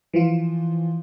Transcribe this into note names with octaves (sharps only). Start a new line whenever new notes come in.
E3 F3 F4